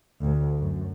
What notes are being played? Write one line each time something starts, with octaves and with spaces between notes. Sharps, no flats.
D2
F#2